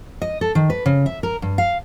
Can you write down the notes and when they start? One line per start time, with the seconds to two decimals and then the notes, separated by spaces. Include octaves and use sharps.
0.22 D#5
0.41 A4
0.55 D#3
0.70 B4
0.86 C#3
1.06 E5
1.23 A#4
1.42 G2
1.58 F5